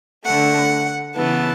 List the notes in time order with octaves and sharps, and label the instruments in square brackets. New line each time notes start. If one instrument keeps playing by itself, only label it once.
[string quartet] D3 A3 F#5
C#3 E3 B3 A5